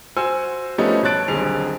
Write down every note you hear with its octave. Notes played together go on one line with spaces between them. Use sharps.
F#4 C5 F#5 G#5 E6
F3 G3 A3 B3 C#4 D#4
B2 C#5 A5 F#6 A6 D7
D#1 B1 D3 C4 G#4 F7